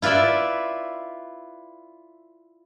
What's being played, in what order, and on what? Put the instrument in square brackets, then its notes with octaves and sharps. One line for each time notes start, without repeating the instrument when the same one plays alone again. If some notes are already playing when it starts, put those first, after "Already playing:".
[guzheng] E4 F4 B4 D5 E5